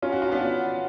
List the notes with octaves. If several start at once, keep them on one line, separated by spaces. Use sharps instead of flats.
C#4 F4
F#4
F4
B3 D4